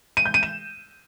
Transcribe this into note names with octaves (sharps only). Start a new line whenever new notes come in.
D#7
G6
D#7
E7